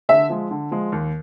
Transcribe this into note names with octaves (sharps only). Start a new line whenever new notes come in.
D3 E5
F3 G#3
D3
F3 G#3
D#2